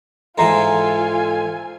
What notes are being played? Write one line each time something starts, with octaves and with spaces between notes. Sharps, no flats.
G#2 E3 F4 A4 C5 G#5 A#5